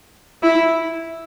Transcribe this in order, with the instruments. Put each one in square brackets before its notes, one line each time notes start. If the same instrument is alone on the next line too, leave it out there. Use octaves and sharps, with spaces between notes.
[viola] E4